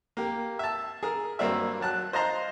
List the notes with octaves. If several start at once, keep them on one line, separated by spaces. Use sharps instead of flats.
A#3 G4
E5 A5
G#4 A#4
G2 F#3 A#3 C4 D5 E5
F#3 A5 F#6
C5 D#5 F5 A5 A#5 C6